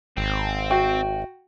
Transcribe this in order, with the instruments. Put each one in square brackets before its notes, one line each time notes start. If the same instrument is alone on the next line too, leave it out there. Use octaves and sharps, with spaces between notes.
[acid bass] G#1 [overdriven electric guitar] C4
[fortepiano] F#4 [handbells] G5